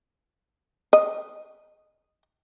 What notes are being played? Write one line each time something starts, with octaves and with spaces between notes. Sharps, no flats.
D#5